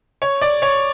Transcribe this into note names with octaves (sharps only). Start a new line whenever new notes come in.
C#5
D5
C#5